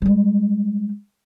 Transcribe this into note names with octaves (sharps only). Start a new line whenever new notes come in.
G3 G#3